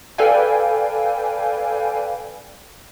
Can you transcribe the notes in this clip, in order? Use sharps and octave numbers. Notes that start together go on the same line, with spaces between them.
A4 B4 D5 F5 G5 G#5